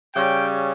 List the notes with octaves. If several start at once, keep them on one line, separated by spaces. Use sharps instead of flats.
C#3 G3 C#4 G5